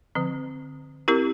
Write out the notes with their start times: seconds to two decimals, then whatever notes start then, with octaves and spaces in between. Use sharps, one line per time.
0.15 D3 F3 C4
1.08 C4 E4 G4 A#4